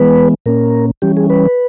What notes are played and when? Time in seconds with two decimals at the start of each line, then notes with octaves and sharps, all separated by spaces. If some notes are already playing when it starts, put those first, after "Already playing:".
Already playing: E3 G#3 B3 B4
0.46 A#2 A#3 C#4 A#4
1.02 E3 G3 C#4 G4
1.17 G#4
1.30 B4